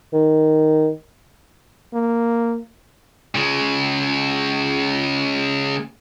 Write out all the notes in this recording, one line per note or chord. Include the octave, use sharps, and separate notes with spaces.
D#3
A#3
C#3 G#3